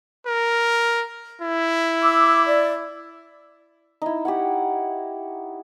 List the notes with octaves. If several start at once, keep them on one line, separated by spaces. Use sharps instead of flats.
A#4
E4
D6 E6
D5
D#4 E4
G4 C#5 F#5